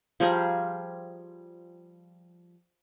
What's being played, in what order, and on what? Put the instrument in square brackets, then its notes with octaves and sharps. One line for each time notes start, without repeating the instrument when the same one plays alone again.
[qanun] F3 G3 G#4 A#5